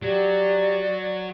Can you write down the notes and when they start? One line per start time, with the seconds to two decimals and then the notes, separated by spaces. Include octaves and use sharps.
0.02 F#3 G4 D5